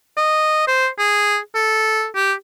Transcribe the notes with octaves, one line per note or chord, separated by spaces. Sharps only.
D#5
C5
G#4
A4
G4